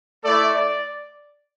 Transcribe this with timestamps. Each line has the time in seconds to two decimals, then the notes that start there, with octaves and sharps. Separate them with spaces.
0.24 A3 E4 A4 D5
0.52 D5